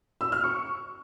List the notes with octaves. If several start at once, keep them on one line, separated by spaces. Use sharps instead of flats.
E6
F6
C#6